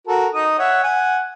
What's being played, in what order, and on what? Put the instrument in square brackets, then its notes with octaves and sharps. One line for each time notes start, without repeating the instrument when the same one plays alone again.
[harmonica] F#4 A4 A#4
D#4 D#6
C#5 E5 F#5
F#5 G#5